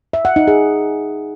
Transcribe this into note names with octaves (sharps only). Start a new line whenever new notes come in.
E5
F#5
D#4
G#4